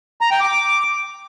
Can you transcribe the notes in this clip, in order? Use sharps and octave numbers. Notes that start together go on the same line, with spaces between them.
A#5
G5
D6